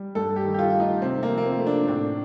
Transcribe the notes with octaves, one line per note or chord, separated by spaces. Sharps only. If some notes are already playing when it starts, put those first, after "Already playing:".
Already playing: G3
G2 A4
G4
D#3
G4
F4
A3
D#4
C3 C4
A#3
F3
A#3
C4
A3
D4
A2 D4